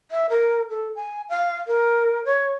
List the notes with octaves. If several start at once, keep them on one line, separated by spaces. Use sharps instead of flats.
E5
A#4
A4
G#5
F5
A#4
C#5